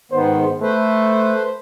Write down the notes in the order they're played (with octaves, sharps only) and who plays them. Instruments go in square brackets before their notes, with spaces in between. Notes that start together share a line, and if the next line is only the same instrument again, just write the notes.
[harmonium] G#2 D#3 B3 [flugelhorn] C5
[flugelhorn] A3 [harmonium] B4 C5